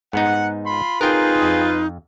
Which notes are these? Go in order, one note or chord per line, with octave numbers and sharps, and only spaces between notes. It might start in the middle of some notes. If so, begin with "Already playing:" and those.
G#2 B3 D#4 F#5
F4 B5 C6
C4 D#4 F4 G#4 A#4 B4 G5
F2